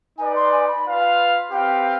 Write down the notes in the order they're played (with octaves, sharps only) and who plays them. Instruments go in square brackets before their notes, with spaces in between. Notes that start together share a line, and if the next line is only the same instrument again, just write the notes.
[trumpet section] D#4 B4 D5 [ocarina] G#5
[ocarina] C6
G#5
B5
[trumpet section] F4 B4 F5
[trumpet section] C4 G4 B4 F5 [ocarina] G5